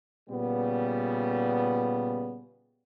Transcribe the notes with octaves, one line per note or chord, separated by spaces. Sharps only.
A#2 C#3 G3 B3